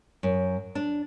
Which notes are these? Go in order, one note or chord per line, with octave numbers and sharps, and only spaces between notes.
F#2
D4